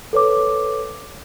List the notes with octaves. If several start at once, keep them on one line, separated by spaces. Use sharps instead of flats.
A4 B4 C#5 D6